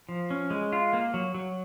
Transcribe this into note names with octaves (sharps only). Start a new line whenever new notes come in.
F3
C#4
G#3
F4
A#3
F#3
F#3